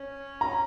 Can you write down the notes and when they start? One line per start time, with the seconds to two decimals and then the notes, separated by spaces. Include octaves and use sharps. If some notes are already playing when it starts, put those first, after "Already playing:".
Already playing: C#4
0.41 A#5